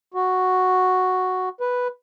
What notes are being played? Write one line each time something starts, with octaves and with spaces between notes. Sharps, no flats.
F#4
B4